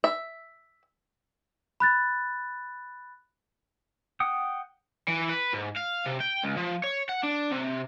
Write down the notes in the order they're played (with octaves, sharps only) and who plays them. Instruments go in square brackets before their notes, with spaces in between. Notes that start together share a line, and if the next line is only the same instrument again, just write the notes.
[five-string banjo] E5
[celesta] B5 F#6 A6
[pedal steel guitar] F#5 G5 D#6
[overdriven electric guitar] E3
B4
G#2
F5
C3
G5
C#2
F3
C#5
F#5
D4
C3